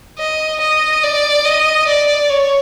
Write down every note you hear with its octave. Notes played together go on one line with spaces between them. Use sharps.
D#5
D#5
D5
D#5
D5
C#5